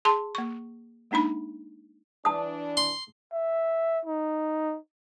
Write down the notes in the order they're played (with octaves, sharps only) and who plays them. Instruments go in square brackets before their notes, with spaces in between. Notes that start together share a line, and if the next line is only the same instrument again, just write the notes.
[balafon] G#4 A5 C6
A#3 C#6
G#3 A#3 D4 D#4 B5
[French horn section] E3 D4 [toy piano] A5 D#6
[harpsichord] C6
[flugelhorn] E5
D#4